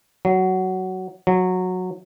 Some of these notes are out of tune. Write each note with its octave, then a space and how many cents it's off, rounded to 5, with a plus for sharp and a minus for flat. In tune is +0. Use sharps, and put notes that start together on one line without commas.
F#3 +10
F#3 -15